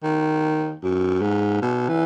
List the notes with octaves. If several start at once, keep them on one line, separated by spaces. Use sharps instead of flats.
D#3
F#2
G#2
B2
E3